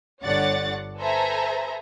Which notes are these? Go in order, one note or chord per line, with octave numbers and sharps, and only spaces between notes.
G1 D3 C#5 D5 F#5 A6
A4 B4 C5 E5 G#5 A#5